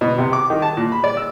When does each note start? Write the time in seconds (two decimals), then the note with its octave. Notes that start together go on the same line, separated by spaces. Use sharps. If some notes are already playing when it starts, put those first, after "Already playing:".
0.01 B2
0.18 C3
0.33 D6
0.50 D#3
0.62 A5
0.77 A#2
0.92 B5
1.04 D5
1.17 E6